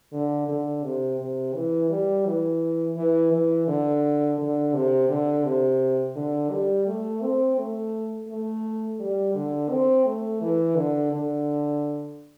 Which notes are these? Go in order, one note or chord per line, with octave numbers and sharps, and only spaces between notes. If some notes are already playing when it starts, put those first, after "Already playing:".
D3
D3
C3
C3
E3
G3
E3
E3
E3
D3
D3
C3
D3
C3
D3
G3
A3
C4
A3
A3
G3
D3
C4
A3
E3
D3
D3